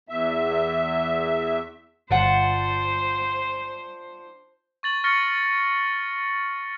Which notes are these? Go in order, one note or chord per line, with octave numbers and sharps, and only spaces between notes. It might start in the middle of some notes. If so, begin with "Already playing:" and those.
E2 E5
G1 D4 F4 C5 F#5
C#6 A6 F#7
C#6 F6 A6 A#6 C#7 G7